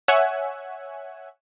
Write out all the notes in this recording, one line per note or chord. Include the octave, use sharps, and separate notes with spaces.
C#5 E5 F#5 G#5